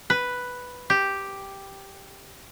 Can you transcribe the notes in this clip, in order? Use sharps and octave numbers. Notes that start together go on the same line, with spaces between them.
B4
G4